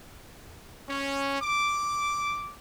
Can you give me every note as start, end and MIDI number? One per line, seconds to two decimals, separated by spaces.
0.89 1.40 61
1.41 2.53 86